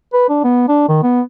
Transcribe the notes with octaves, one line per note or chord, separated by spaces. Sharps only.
B4
D4
B3
D4
D#3
B3